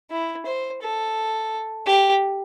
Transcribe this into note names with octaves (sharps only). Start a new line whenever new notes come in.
E4
C5
A4
G4